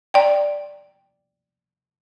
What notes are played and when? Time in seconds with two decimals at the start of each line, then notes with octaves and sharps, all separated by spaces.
0.14 D5 G5